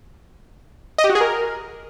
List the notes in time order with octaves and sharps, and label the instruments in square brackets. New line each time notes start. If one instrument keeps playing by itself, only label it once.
[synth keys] D#5
G4
F#4
G#4
A#4